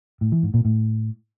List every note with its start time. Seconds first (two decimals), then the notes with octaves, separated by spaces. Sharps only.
0.21 A2
0.32 E3
0.43 G#2
0.54 A#2
0.65 A2